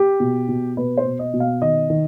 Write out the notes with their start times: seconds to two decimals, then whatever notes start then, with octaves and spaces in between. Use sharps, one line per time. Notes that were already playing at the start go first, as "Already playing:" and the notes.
Already playing: G4
0.20 B2
0.49 B2
0.77 B2 B4
0.98 C5
1.05 B2
1.19 D#5
1.34 B2
1.40 F5
1.62 D#3 D#5
1.90 D#3